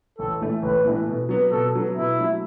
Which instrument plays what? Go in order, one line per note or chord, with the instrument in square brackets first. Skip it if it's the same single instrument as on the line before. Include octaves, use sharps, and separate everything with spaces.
[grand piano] A1 [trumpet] A4
[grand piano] A2 E3 A3
[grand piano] A1 [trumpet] B4
[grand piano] A2 E3 A3
B2
F#3 B3
[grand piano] B2 [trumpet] A4
[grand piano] F#3 B3
[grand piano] B2 [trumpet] E4
[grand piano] F#3 A3